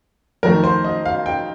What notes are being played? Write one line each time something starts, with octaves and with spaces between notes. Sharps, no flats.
F2 D#3 A3 A#4
C5
D#5
F5
G5